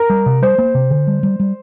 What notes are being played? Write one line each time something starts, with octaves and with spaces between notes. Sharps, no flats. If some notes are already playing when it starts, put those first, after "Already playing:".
Already playing: A#4
G3
C3
G3 C5
A#3
C3
D3
G3
G3
G3